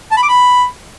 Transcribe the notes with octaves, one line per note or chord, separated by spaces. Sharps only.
A5
B5
D6
B5